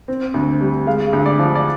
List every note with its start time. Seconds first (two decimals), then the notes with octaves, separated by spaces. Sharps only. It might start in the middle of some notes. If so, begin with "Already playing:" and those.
0.08 C4
0.34 D2
0.61 G3
0.87 G#3 F5
1.13 D2
1.26 D5
1.39 F3
1.55 D5